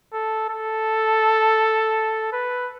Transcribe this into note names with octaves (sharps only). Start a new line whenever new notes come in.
A4
A4
B4